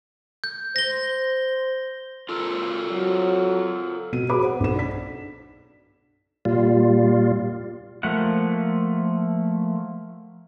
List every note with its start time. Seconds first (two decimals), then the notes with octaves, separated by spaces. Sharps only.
0.44 G6
0.76 C5 A#6 G7
2.29 F4 A4 A#4
2.92 F#3
4.12 B2 B3 D#7
4.29 F#4 G#4 B4 B5 D6
4.43 C5 F#5
4.60 B1 E7
4.76 D4 B6
6.45 A#2 G3 F4
8.03 F3 A3 A#3 F#5